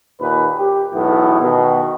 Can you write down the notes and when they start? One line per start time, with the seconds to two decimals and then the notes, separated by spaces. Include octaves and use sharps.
0.20 D#2 A#2 B4
0.57 G4
0.94 B1 E2 A2 B3 E4
1.42 B2 D#3